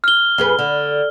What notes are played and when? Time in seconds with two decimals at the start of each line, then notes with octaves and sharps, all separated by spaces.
0.04 F6 G7
0.38 F2 G#4 B4
0.59 D3